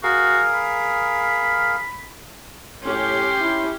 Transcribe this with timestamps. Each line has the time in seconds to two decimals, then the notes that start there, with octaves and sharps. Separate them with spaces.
0.03 F#4 G#4 A#4 F5
0.54 B5
2.85 A2 C#4 G4 G5 C6
3.41 E4